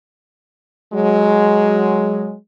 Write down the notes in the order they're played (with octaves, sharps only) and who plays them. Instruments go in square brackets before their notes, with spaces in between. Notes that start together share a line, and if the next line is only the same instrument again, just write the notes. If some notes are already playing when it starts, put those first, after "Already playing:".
[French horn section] F#3 G#3